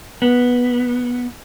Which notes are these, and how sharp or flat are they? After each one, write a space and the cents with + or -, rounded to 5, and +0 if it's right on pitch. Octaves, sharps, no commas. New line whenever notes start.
B3 -10